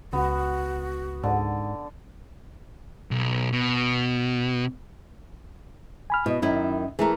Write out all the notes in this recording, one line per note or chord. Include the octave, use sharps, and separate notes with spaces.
C#2 B3 F#4
G#2 D3
B1
B2
G#5 B5 F6
B2 E4 D#5
F#2 D#3 C#4 E4
E3 A3 G#4 A#4